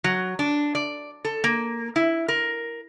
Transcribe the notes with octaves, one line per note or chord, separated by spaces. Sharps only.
F#3
D4
D5
A4
A#3
E4
A#4